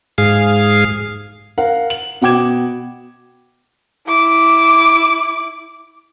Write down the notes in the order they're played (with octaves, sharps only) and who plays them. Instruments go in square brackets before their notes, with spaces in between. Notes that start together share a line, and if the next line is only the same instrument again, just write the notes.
[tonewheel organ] G#2 G#4 F5
[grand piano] A#4 F5 F#5
F#7
B2 F#5 G5 D6 G#6 E7
[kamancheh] E4 D6